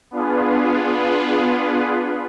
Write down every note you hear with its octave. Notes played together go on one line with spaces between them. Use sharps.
B3 D4 F4 G#4 B4